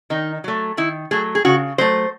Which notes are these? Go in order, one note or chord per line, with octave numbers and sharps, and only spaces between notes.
D#3 D#4
F#3 A3
D#3 E4
F#3 A3 G#4
G#4
C#3 F#4
F#3 A3 C5